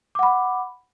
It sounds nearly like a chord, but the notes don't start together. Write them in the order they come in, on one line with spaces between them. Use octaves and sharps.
D6 F#5 B5